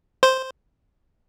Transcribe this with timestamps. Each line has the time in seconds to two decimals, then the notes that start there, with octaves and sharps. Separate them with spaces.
0.23 C5